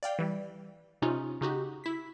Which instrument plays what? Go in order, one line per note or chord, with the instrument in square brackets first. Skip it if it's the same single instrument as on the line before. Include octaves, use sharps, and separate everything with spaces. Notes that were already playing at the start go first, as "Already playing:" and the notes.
[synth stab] D5 F5 G5
E3 G3
C3 C#4 D#4 F4
C#3 D#4 F#4 G4
E4 B6